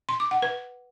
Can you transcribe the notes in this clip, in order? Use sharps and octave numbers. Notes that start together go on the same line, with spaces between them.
C6
D6
F#5
B4